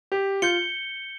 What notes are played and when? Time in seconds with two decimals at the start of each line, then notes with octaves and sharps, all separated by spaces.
0.12 G4
0.42 F4 G6 C#7 G7